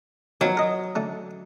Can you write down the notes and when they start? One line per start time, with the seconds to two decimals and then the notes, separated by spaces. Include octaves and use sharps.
0.41 D#3 F3 F#3 B3
0.57 A#4 D#5
0.95 D3 A3